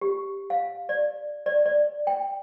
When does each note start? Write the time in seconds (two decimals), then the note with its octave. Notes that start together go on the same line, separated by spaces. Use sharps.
0.01 G4
0.50 F5
0.89 D5
1.46 D5
1.66 D5
2.07 G5